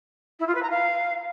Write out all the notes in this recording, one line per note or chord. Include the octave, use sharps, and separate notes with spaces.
E4
F4
B4
A#5
F5